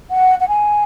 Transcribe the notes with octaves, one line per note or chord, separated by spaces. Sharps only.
F#5
F#5
G#5